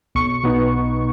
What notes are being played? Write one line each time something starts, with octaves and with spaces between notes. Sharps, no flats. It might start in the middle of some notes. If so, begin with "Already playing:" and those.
B1 C#6
B2 B3 D#4